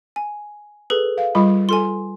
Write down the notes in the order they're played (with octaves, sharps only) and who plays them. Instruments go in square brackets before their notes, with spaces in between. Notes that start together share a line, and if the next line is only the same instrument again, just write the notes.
[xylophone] G#5
G#4 A4 B4
[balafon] F5
G3 F4 B5
[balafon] F4 A4 [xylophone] G#5 C6